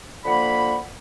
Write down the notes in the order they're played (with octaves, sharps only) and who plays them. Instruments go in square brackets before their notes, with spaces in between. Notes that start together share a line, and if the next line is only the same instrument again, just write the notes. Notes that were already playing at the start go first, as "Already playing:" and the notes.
[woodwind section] D3 F3 A#3 F#5 B5